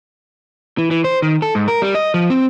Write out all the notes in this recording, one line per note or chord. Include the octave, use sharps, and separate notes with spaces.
E3
E3
C5
D#3
A4
G#2
A#4
G3
D#5
F3
C4